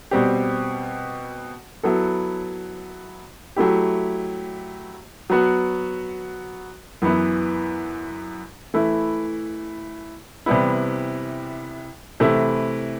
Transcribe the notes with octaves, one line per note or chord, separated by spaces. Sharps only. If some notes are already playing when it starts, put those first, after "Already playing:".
B2 G3 C4 G4
F#3 B3 E4 A4
F#3 A3 E4 G4
F#3 B3 F#4
F#2 E3 B3 E4
E3 A3 E4
C3 E3 G3 B3 E4
C3 E3 A3 E4